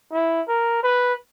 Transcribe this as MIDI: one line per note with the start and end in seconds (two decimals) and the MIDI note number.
0.12 0.41 64
0.48 0.80 70
0.83 1.14 71